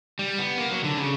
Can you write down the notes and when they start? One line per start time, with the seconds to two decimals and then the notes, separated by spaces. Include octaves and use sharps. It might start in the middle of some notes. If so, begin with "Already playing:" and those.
0.19 G3
0.38 B3
0.58 A#3
0.71 F#3
0.84 D3
0.97 C#3